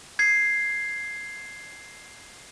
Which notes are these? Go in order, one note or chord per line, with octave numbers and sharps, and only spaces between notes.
G#6 C7